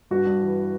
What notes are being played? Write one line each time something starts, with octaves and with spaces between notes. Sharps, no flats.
G2 F#4
G2
E3